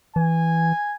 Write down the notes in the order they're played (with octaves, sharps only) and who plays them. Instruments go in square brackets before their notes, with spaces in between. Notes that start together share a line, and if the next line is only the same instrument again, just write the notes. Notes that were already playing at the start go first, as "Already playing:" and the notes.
[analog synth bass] E3 [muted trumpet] G#5